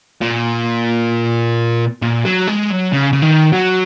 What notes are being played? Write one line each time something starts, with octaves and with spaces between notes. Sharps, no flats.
A#2
A#2
F#3
G#3
F#3
C#3
C#3
D#3
F#3